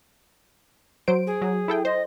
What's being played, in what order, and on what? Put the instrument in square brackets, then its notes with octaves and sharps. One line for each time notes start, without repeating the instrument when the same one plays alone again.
[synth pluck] F#3 C5 D7
[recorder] G#4
[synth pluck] F#3
E4 A4 G5
[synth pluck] C5 [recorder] D#5